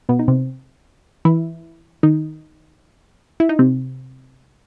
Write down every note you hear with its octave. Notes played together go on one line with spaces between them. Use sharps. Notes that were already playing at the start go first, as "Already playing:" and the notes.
B2 B3
D#4
C3 C4
E3 E4
D#3 D#4
E4
D#4
C3 C4